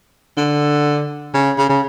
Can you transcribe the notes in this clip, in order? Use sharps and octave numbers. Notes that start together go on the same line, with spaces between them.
D3
C#3
C#3
C#3